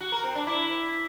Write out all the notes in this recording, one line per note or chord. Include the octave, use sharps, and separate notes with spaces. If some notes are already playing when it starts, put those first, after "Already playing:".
F#4
A#4
C4
D4
E4